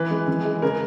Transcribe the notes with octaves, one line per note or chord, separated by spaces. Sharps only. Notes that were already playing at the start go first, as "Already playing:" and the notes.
Already playing: E3 B4
G#3
E3
G#3
C#3 A#4